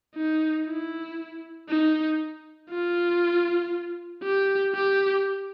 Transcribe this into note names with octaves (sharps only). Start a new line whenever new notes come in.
D#4
E4
D#4
F4
G4
G4